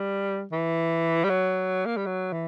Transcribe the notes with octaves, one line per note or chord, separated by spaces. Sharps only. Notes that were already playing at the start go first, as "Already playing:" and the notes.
Already playing: G3
E3
G3
F#3
A#3
G3
F#3
E3